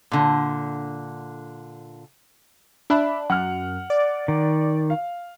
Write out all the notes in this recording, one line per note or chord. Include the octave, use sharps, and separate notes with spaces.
A#2 D3
D4 E5 B5 F#6
F#2 F#5 F6
D5
D#3
F5